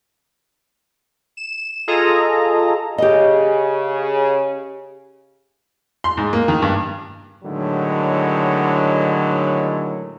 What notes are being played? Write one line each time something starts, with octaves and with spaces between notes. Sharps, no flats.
E7
F4 G#4 A4 D#5 A#5
C#3 G4 D#5
C6
G#2
A#3
D#3
G2
A2 D3 D#3 F#3 G#3